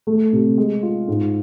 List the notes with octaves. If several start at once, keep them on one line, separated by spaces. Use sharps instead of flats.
A3
C3
G#3
F4
G#2